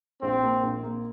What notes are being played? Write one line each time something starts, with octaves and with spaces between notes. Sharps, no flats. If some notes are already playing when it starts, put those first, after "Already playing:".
A#1 C4
A#3
A#1
A#3